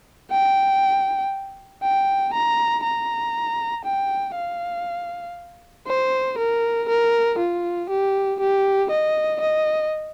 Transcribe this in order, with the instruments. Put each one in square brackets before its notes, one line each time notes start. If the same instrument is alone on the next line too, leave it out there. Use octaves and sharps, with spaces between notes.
[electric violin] G5
G5
A#5
A#5
G5
F5
C5
A#4
A#4
F4
G4
G4
D#5
D#5